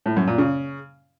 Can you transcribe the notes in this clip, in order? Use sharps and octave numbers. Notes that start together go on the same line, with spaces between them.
A2
F#2
A#2
C#3